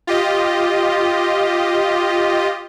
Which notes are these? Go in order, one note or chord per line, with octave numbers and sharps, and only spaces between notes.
F4 G4 D#5